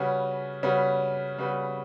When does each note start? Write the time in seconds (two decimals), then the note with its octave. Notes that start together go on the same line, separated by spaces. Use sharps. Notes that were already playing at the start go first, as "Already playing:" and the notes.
Already playing: C#3 G3 C#4 F#4 B4
0.63 C#3 G3 C#4 F#4 B4
1.38 C#3 G3 C#4 F#4 B4